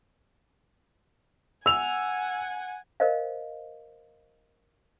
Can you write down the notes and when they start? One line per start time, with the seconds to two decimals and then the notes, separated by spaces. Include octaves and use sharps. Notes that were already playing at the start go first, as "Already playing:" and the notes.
1.66 F#5 G#5 E6 F7
3.00 A#4 C5 D#5 F5